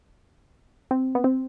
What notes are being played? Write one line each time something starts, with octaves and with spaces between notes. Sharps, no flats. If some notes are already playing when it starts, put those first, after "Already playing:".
C4
B3
C4